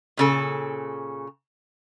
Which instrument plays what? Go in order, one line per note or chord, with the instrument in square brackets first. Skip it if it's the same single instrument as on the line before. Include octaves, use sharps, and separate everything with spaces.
[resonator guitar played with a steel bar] A#2 C#3 A4